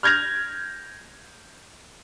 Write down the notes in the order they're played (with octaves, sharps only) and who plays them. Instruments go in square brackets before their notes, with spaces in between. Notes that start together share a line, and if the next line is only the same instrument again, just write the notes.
[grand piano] F6 G6 G#6 A#6 F7